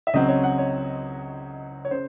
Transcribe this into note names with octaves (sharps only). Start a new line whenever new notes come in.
E5
C#2 C#3 F#3 C4 D#5
C#5
F#5
C#5
C#5
C#3 C5